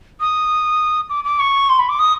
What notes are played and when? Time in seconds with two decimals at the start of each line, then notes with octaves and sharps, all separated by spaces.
0.20 D#6
1.09 D6
1.24 D6
1.39 C#6
1.69 C6
1.78 B5
1.89 D6
1.99 D#6